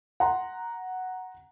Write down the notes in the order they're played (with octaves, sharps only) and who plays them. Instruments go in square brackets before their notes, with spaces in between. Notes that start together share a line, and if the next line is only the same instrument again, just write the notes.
[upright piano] F#5 A#5 C6